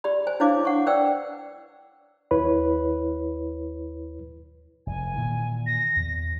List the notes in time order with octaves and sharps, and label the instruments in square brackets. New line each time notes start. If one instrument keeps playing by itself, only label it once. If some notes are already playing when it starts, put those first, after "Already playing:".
[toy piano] G4 D5 B5
C5 G#5
D4 E4 C5 C#5 F5 D6
F#5 C#6
B4 C5 D5 G5 E6
[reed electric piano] D#2 E4 B4 C#5 B5
[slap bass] F1 [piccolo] G#5
[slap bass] A#2 D#3 E3
[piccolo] A#6
[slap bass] E2